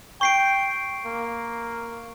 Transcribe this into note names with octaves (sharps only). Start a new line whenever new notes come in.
G5 C#6 C7 D7
A#3